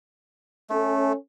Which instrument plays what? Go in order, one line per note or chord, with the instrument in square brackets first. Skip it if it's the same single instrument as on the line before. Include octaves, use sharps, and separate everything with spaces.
[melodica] A3 [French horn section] C#4 A4